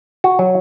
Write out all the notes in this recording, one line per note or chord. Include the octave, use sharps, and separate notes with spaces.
F#4
F#3